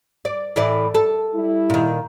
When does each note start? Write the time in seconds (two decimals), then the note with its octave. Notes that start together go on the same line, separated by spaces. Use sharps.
0.25 D5
0.56 A2 E3 D5
0.94 A4
1.34 G3 E4
1.70 A#2 D#3